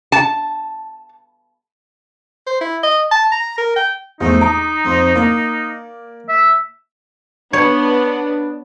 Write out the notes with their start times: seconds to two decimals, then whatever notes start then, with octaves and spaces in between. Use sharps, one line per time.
0.12 A5
2.47 C5
2.61 E4
2.83 D#5
3.11 A5
3.32 A#5
3.58 A#4
3.76 G5
4.21 E2 F3 A3 D#4
4.41 A#5 D6 D#6
4.85 F2 F3
5.16 A#3 D5
6.29 E5
7.53 B3 D4 C#5